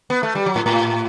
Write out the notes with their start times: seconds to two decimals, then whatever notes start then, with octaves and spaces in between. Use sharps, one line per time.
0.10 B3
0.23 A3
0.35 G3
0.46 F#3
0.56 A2
0.66 A2